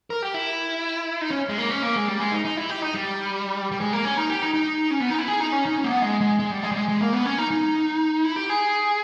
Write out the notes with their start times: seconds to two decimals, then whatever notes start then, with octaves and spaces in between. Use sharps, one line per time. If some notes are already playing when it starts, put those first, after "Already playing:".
0.10 A#4
0.22 G4
0.34 E4
1.21 D#4
1.31 C#4
1.49 G#3
1.58 A#3
1.70 C#4
1.82 A#3
1.96 G#3
2.08 G3
2.20 G#3
2.32 D#4
2.45 D#4
2.57 E4
2.69 G4
2.82 D#4
2.94 G3
3.72 G3
3.80 G#3
3.93 A#3
4.05 C#4
4.17 D#4
4.30 G4
4.42 D#4
4.54 D#4
4.91 C#4
5.00 B3
5.10 D#4
5.18 E4
5.28 G#4
5.40 D#4
5.52 C#4
5.66 D#4
5.77 C#4
5.84 A#3
5.91 B3
6.02 G#3
6.21 G#3
6.40 G#3
6.51 G3
6.63 G#3
6.72 G3
6.76 G#3
6.89 G#3
7.01 A#3
7.13 B3
7.26 C#4
7.38 D#4
7.51 D#4
8.25 E4
8.36 G4
8.50 G#4